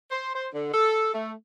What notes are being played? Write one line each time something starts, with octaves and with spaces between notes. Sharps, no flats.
C5
C5
D3
A4
A3